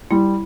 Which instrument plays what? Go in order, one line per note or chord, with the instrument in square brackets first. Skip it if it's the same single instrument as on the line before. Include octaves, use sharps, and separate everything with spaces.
[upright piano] G3 [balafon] E4